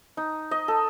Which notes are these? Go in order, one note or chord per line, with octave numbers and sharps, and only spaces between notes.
D#4
D#5
A4